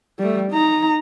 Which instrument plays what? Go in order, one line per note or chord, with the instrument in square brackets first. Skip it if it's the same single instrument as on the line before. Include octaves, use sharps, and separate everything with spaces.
[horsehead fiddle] G3 A3
D#4 A#5